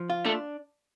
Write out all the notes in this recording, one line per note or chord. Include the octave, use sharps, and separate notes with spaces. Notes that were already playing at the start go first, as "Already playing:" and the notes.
Already playing: F3
F4
A3 D4